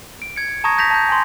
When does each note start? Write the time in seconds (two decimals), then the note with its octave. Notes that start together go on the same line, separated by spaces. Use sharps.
0.22 D7
0.36 G#6 C#7
0.64 A5 A#5 C#6 D#6 G#6 A#6
0.78 G6 A#6 B6 F7
0.91 A5 G6
1.09 G#5 C6